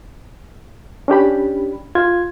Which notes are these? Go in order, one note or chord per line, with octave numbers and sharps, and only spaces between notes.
C#4 D4 G4 B5
F4 G#6